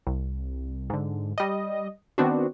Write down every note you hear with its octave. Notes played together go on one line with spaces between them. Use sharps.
C2
G#2 D3
G3 D#5
D#3 B3 C4 D4 F#4